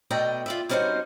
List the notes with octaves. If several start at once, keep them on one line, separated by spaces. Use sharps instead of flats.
B2 A3 D5 D#5 G5 A#5
F4 D5 E5
G3 C4 C#4 D#4 F#4 C5